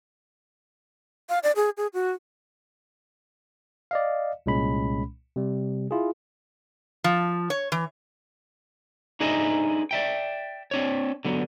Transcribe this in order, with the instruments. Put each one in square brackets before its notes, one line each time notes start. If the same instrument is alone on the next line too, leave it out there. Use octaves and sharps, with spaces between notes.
[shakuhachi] F5
D5
G#4
G#4
F#4
[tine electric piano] D5 D#5 F5
C2 A#2 G#3 C#4 B5
C3 G3
E4 F4 G#4
[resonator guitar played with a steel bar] F3
C#5
E3
[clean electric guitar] D4 D#4 G#4 B4 D#5 E5
D5 E5 G5
C4 D4 C#5
D3 F#3 B3